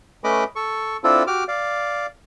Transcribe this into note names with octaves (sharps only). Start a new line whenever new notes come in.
A3 C#4 B4 D#5 B5 D6
A4 C#6
C4 D4 E4 F4 A4
F#4 G4 D6 F6
D5 F5